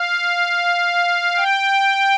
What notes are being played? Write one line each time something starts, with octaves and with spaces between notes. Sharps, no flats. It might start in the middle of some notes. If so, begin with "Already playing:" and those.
Already playing: F5
G5